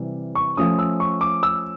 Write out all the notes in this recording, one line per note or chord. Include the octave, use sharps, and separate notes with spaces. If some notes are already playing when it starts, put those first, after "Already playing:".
Already playing: C3 E3 G3
C#6
F3 A3 C#4 D#6
E6
C#6
D6
E6